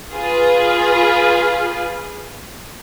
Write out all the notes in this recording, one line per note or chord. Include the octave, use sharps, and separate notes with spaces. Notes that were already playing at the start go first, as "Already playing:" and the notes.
F4 G#4 B4